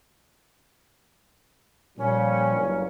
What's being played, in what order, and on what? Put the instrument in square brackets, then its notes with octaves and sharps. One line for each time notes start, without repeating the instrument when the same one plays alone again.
[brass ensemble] A#2 F3 G3 [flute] C#4
[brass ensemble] F#1 G2 A#3